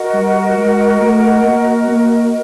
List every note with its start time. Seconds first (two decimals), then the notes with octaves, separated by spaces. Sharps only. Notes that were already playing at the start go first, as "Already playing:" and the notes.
Already playing: F#4 A#4 D#5
0.14 G3
0.58 G#3
1.01 A3
1.45 A#3
1.88 A#3